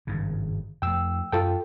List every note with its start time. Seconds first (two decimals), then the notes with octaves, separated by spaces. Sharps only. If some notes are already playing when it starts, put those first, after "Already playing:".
0.07 G#1 G2 C#3
0.82 F2 A3 G5 E6
1.32 F#2 F4 A4 G5